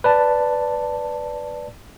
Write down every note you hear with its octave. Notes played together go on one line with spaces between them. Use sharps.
B4 D5 A5